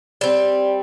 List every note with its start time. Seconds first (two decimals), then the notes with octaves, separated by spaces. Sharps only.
0.21 G3 C4 D5